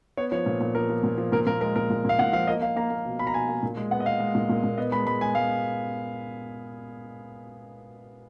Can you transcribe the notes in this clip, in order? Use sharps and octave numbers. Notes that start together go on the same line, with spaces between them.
B3 C#5
F3 C#5
A#2
A#2
F3 A#4
F3
A#2
F3
A#2 A#4
A#2 A#4
G#3 A#4
A#2 A#4
A#2
A#2 F5
A#2 F#5
F3 F5
A#3 D#5
A#3 F5
A#3 A#5
A#3
B2
B2 B5
A#5
B2 G#5
A#3
A#2
G#3
B3 F#5
D#5
B3 F5
G#3
A#2
A#2
A#2
B3 D#5
G#3 B5
G#3 B5
G#3 G#5
G#3 F5